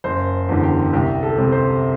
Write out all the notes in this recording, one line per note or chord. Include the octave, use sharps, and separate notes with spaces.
F#1 C5
E2 D3
G4
C2 G4
A4
C3 G3 C4
C5